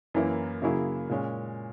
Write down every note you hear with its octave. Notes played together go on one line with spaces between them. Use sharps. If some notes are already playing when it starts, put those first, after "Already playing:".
F#2 E3 A#3 E4
C#3 F#3 A#3 E4 G#4
A#2 G#3 C#4